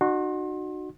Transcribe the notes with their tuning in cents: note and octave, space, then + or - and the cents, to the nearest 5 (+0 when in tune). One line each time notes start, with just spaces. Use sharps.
D#4 -40 F#4 -5 C6 +30